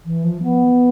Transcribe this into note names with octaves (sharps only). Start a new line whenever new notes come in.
E3
F3
B3